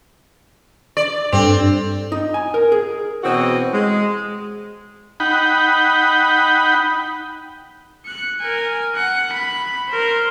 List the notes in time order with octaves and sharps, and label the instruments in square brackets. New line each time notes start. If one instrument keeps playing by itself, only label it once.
[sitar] D5
[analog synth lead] G2 [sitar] C4 [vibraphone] D4 A4
[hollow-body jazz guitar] D#4
G#5
A#4
G#4
[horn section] B2 E3 C4 C#4 F#4 D#5
G#3
[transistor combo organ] D#4 F#5 G5 B5
[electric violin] F#6 C#7
A#4 G#5
F#5
B5
A#4 C5